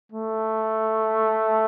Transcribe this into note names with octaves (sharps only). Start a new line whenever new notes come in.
A3